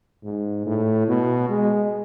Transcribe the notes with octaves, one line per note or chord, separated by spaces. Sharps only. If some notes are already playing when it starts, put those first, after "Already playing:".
G#2
A2
B2
G#3